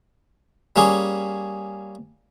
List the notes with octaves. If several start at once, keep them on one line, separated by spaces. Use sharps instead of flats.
G3 A#3 C#4 G#4